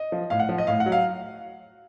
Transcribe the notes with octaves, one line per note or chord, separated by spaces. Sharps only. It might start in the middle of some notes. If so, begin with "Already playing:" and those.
Already playing: D#5
F3
A2 F5
F#5
F3
D#5
A2 F5
F#5
F#3
F5